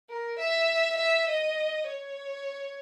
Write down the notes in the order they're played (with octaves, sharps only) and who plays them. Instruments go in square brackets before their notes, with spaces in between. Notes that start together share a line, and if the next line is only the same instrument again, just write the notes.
[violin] A#4
E5
E5
D#5
C#5